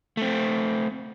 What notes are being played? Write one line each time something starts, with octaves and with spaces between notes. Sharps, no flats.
A3 C4